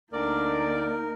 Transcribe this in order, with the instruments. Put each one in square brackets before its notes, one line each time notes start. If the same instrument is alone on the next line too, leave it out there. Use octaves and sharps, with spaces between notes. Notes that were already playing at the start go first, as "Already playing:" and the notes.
[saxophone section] D2 D5 [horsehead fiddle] A#3 D#4 [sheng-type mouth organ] A#4